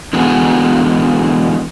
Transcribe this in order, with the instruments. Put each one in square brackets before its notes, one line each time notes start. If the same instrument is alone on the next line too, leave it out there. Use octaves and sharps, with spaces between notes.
[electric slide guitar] D3 E3 G#3 B3 F#4 G#4